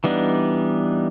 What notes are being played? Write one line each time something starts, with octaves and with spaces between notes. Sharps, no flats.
E3 G3 B3 D4 D#4